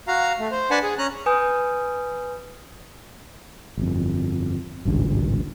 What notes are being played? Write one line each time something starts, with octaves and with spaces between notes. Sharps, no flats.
F#4 F5 A#5
A3
C5
D4 B4 F#5 G#5 A5
G#4
C#4 A#5 F#6
B4 G#5 D#6 G6
G1 F2
D1 G#1 C#2 G2